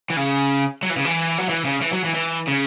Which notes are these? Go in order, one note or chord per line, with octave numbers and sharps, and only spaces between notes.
E3
C#3
F#3
E3
C#3
E3
F#3
E3
C#3
E3
F#3
E3
E3
C#3